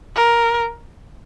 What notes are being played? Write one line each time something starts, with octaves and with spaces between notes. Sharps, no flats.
A#4